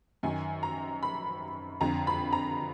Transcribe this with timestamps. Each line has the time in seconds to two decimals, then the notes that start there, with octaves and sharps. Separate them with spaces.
0.23 F#2 D#3 G#5
0.63 A#5
1.03 B5
1.81 F2 D3 A#5
2.07 B5
2.33 A#5